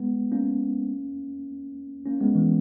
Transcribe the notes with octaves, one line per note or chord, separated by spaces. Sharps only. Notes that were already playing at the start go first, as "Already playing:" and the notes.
Already playing: G#3 B3
A#3 C#4
A#3 C#4
G#3 B3
E3 G#3